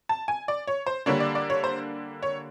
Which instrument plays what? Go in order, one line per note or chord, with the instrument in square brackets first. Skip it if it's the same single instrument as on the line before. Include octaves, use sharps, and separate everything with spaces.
[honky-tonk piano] A5
G#5
D5
C#5
C5
D3 G3 A#3 D4 C#5
D5
D5
C#5
C5
C#5